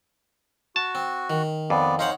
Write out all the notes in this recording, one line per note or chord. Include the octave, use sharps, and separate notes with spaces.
F#4 A5
C4
D#3
F2 B3 D5
D#4 C5 C#5 F5 F#5